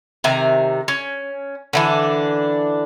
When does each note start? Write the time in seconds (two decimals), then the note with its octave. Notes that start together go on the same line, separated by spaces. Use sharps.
0.24 C3 D#3 G#5 A#5
0.88 C#4
1.73 D3 E3 D4